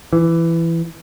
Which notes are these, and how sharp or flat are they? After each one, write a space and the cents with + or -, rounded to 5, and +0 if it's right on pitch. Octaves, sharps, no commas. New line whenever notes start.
E3 +15